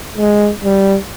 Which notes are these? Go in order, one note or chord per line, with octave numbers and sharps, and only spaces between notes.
G#3
G3